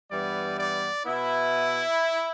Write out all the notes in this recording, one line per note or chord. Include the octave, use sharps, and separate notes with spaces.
G2 E3 G3 B3 D5
D5
B2 B3 E4